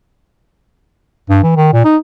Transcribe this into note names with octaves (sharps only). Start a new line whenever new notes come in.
G2
E3
D#3
A#2
D#4